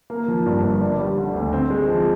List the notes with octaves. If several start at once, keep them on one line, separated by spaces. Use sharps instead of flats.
A#3
F3
G2
G1
D4
G3
D3
D2
C4
G#3
F3